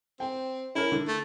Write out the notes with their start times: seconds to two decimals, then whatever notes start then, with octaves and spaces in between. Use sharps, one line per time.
0.20 C4 G5
0.75 C#4 E4 A#4
0.92 D3
1.08 A3